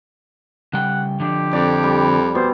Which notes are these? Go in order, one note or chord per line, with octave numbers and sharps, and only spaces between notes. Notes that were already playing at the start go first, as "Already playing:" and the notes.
C#3 G3 F#5 G5
D3 F3 D4 G4
F2 D5
G3
B2 C5